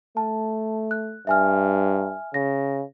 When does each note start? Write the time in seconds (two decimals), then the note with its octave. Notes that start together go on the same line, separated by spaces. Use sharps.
0.17 A3 A5
0.91 F#6
1.27 G2 E5 G#5 F6
2.34 C#3 A#6